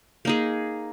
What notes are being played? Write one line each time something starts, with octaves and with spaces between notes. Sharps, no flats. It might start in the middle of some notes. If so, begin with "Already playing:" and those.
A#3 D#4 G#4